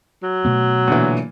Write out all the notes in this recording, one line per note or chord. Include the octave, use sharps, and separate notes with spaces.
F#3
B2 A3 B3
A#2 D3 E3